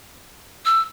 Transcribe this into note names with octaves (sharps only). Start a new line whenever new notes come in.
E6